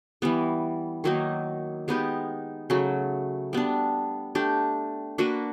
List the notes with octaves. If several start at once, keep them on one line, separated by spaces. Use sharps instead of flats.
E3 G3 B3
D#3 F#3 A#3 D#4
G#3 B3 D#4 G4
C#3 F#3 A3
G3 B3 D4
A3 D4 G4
A#3 D4 F#4 B4